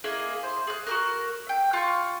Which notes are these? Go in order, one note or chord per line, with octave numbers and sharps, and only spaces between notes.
A#3 E4 G#4 D#5
C5
G#4 F#6
F#4 G4 A#4
E5 G5
F4 C#6